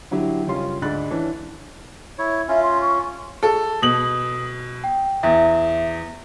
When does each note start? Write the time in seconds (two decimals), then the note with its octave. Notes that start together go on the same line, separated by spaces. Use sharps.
0.11 D3 F#3 E4 G4
0.47 F#1 G3 C#4 F4 C6
0.82 D2 G#2 D5 B5 F#6 A6
1.11 E3 C#4 D4
2.19 E4 C#5
2.49 C#4 F4 E5
2.63 C6
2.81 C#6
3.43 G#4 A4
3.82 B2 D#6 F#7
4.84 G5
5.23 E2 E5